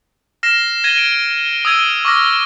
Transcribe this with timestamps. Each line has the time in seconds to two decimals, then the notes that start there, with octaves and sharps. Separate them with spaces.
0.43 F6 A#6 C7 E7
0.84 G#6 A#6 D#7 G7
0.98 D7
1.65 D#6 E6 G#6 D#7 G7
2.05 C#6 D6 F6 A#6